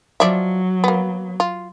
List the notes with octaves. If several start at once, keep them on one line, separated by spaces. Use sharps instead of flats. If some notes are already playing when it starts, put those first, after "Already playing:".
F3 F#3 D5 E5
A#3 B3
F4